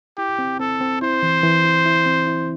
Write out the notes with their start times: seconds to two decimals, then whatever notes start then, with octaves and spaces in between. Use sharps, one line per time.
0.18 E4 G4
0.39 C4
0.60 C4 A4
0.81 C4
1.02 E4 C5
1.23 E3
1.43 E3
1.64 E4
1.86 E4
2.06 C4
2.27 E4